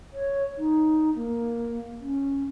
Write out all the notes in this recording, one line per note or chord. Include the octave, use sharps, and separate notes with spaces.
C#5
D#4
A#3
C#4